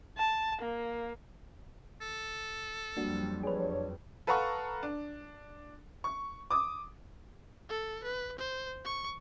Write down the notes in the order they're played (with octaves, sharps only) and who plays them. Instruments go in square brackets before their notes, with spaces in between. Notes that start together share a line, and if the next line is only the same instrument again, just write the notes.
[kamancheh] A5
A#3
[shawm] A4
[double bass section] F2 F#3 G3 [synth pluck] A#3 D4 F#4
[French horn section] D4 C#5 [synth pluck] G#4 B4
[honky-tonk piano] A4 B4 F5 F#5 A#5 C#6
D4
C#6
D6 D#6
[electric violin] A4
B4
C5
C#6